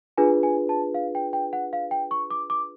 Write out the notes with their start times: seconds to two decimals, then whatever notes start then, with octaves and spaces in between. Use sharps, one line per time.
0.18 D4 F4 G#4 B4 G#5
0.43 G#5
0.69 A5
0.94 F5
1.15 G5
1.33 G5
1.53 F#5
1.73 F5
1.91 G5
2.11 C#6
2.31 D6
2.50 D6